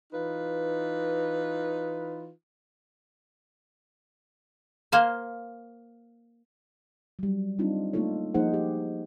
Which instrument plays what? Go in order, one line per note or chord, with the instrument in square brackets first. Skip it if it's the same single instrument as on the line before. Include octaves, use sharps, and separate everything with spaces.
[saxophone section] E3 D#4 F4 B4
[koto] A#3 C5 F5 G#5
[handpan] F#3 G3
G3 C4 D4 D#4 F4
A3 A#3 D#4 F4 A4 C#5
F3 A#3 D#4 G#4 C5 F#5
G4